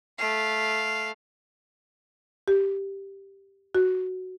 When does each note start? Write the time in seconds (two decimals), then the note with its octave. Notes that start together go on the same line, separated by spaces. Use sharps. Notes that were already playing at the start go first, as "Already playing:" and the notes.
0.18 A3 F5
2.48 G4
3.75 F#4